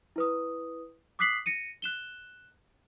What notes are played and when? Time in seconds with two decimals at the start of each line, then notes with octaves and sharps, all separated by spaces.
0.16 E4 B4 D#6
1.19 D6 D#6 F#6 B6 C7 F#7
1.46 A#6 C#7 D#7
1.82 F#6 E7 G7